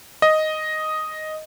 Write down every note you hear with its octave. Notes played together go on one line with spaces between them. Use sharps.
D#5